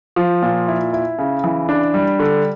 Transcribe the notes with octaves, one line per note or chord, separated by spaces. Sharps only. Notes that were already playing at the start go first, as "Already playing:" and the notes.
F3
A#2
E4
E4
C#3
E3
D4
G3
D3